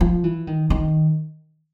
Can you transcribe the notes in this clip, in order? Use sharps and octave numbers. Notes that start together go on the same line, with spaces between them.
F3
E3
D#3
D#3